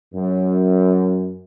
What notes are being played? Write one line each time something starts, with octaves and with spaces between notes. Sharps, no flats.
F#2